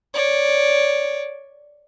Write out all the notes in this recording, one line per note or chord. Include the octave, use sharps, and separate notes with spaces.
C#5 D5